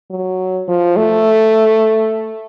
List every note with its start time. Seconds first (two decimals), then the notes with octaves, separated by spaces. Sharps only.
0.11 F#3
0.68 F3
0.96 A3